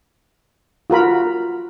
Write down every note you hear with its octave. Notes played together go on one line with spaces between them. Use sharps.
F4 F#4 A#4 B5